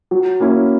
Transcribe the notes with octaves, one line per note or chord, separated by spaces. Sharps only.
F#3
A#3 C#4 E4